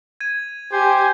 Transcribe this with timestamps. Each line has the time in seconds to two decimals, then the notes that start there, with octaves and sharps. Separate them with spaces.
0.20 G#6 D#7
0.72 G4 C5 G#5